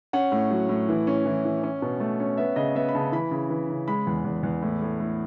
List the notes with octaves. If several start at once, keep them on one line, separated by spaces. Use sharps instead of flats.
C#4 F#5
A2
F#3
A2
E3
C#4
E3
E3
C#4
B2
A3
C#4
B3 E5
C#3 D#5
B3 E5
B5
C#3 A5
E3 B5
C#3
E3
C#3
G#3 B5
E2
E2
E2
A2
A2
A2